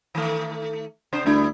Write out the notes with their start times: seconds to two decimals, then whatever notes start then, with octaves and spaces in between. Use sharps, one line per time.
0.15 D#3 A3
1.13 C3 D4 C5
1.26 D2 G3 D4 E4